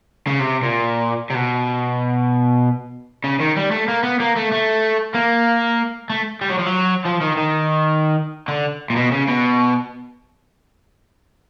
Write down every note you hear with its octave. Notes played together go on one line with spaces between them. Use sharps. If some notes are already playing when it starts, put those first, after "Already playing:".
C#3
C3
A#2
C3
B2
C#3
D#3
G3
A3
A#3
B3
A#3
A3
A3
A#3
A3
G3
F#3
F3
F#3
F3
D#3
D#3
D3
A#2
B2
C#3
B2